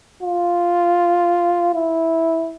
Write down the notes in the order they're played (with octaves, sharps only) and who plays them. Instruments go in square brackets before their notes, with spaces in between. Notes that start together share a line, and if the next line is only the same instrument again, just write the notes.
[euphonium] F4
E4